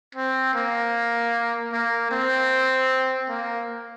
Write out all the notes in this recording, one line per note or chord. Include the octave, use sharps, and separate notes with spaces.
C4
A#3
A#3
C4
A#3